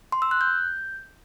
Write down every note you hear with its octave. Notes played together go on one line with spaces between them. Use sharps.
C6
E6
F#6
G6